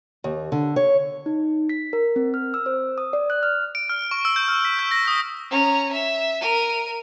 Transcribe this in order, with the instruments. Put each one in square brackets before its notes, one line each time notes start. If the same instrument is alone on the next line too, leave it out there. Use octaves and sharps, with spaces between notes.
[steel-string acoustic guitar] D#2
D3
C#5
[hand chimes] D#4
B6
A#4
C4
F6
E6
C5
D#6
D5
F#6
F6
[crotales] D7
F6
C#6
E6
G6
F6
B6
G6
A#6
D#6
[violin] C#4 A#5
E5
A#4 D#7